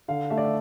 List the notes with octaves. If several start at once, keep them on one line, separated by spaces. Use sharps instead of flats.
D3 F5
A3 E5
D5
E5